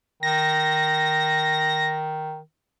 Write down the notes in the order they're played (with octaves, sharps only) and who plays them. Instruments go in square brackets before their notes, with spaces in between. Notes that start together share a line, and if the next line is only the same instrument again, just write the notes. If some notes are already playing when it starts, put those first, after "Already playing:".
[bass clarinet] D#3 [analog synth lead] A#6